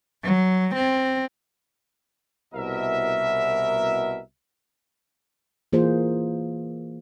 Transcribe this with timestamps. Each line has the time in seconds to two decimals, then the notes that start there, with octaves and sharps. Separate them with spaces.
0.23 F#3
0.74 C4
2.54 C2 B2 A#4 E5
5.73 E3 A#3 F4 G#4 C5